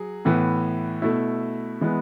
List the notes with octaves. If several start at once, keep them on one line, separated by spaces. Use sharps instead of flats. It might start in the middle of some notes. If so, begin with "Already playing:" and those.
Already playing: F#3 G#4
A2 E3 B3
B2 A3 E4
E3 G#3 B3